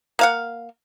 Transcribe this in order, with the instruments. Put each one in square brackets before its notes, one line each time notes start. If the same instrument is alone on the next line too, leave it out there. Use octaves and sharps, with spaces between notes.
[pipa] A#3 F5 F#5